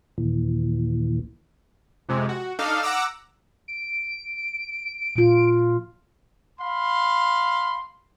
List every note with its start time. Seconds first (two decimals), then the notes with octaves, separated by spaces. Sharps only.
0.18 D#2 A#2 E3
2.09 F2 C3 G#3
2.29 F#4
2.59 D4 D#4 A4 F5
2.83 F#5 A#5 D6 E6
3.68 D7
5.16 A#2 F3 F4
6.59 F5 B5 C6